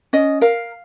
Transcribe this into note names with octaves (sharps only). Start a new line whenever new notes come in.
C#4 D#5
A#4 F5